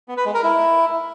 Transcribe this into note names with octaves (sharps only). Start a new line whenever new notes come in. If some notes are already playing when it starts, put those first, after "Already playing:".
B3
B4
G#3
A#4
E4